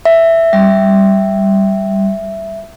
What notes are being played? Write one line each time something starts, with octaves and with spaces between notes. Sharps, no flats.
E5
G3